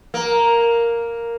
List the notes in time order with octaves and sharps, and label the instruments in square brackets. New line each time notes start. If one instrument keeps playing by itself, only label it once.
[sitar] A#3